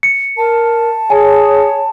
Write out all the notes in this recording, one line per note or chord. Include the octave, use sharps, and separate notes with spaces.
C#7
A#4 A5
G#4 C#5 G#5